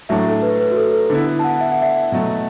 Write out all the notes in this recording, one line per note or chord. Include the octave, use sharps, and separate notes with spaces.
A2 F#3 A3 D4 E5
A4
B4
B4
F#4
A4
A4
D3 B3 E4
A5
F#5
E5
F#5
E5
B2 F#3 A3